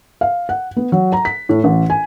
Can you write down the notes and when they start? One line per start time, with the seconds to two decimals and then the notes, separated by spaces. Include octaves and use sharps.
0.21 F5
0.49 F#5
0.76 B3
0.92 F#3
1.13 A#5
1.25 B6
1.49 A2
1.64 A1
1.90 G#5